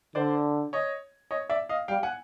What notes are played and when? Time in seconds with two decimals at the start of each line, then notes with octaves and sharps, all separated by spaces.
0.15 D3 C5 D5
0.73 C#5 D#5
1.31 C#5 D#5
1.50 D5 E5
1.69 D#5 F5
1.88 G3 F5 G5
2.03 F#5 G#5